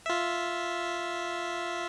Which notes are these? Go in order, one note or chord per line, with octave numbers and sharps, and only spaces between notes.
F4 E5